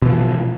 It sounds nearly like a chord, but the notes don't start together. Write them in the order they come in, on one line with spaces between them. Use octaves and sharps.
B2 E3 F3